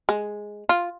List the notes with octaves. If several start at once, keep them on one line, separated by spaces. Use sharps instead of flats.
G#3
F4